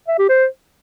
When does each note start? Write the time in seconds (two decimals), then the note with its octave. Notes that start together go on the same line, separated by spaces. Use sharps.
0.08 E5
0.18 G4
0.29 C5